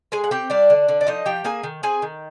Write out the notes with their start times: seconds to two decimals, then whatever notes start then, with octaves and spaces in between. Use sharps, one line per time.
0.12 G#3 G#4 G#5
0.24 F#5
0.31 C4 G4 G5
0.50 G3 D4 D5
0.70 D3
0.88 D3
1.01 D5
1.07 F3 D#4 D#5
1.26 F3 G4 G5
1.44 A#3 G#4 G#5
1.63 D#3
1.83 C4 G#4 G#5
2.02 D#3